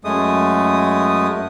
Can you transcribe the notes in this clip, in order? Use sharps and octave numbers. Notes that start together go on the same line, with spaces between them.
F#2 G#3 A3 D#6